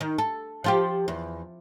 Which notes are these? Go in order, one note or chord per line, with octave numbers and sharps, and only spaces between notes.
D#3
A4
F3 F4 G4
E2